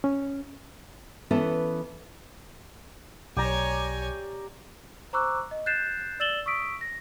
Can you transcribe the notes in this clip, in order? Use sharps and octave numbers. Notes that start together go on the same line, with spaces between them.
C#4
E3 B3 C#4 E4 A4
B1 G4 C#5 D5 G#5 A#5
C5 A#5 C#6 D6 E6 F#6
D#5
F#6 G6 A6 C7 E7
D5 E6 A6 E7 F#7 G7
C#6 D#6 E6 B6 D7
A#6